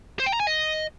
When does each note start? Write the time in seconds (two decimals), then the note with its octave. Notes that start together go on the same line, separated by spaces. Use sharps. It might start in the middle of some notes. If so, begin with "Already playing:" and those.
0.19 C5
0.26 G5
0.33 A#5
0.40 G#5
0.47 D#5